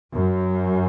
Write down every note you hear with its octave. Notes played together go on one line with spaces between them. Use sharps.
F#2